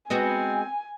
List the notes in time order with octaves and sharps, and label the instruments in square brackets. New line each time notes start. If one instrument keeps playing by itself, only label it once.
[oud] G#3 B3 F#4 [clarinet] C4 [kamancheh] G#5